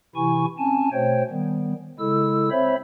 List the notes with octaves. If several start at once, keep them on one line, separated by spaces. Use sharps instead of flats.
C3 E3 E4 G#5 C#6
C4 C#4 G#5 A5
B2 A3 C5 C#5 G5
D#3 G3 B3
C#3 G#3 E4 A4 E6
C4 C5 C#5 E5 B5